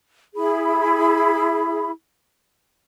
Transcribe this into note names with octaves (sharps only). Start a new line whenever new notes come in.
E4 G#4 B5